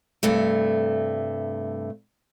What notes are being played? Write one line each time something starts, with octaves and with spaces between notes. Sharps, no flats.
G2 C3 A3